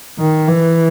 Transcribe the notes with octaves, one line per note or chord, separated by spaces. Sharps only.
D#3
E3